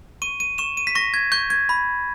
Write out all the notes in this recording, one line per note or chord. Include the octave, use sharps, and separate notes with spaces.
C#6 D#7
D#7
C#6 E7
D#7
B6
C#6 A#6
G#6
C#6 G6
G#6
B5